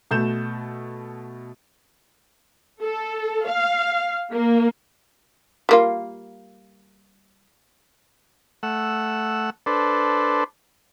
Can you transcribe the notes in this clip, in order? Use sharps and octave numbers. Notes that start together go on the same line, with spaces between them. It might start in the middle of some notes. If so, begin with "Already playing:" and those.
B2 A3 G6 E7
A4
F5
A#3
G3 A#3 F4
A3 F#5 E6
D4 A4 B4 C5